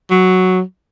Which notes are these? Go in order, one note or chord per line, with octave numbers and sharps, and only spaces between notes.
F#3